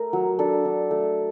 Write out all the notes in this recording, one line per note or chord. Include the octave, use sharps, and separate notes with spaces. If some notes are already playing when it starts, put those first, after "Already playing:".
Already playing: A3 A#4
F#3
D4 A4
D4
A3